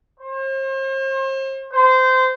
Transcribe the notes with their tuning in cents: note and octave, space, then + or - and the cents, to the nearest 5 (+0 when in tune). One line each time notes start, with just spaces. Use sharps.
C5 +40
C5 -20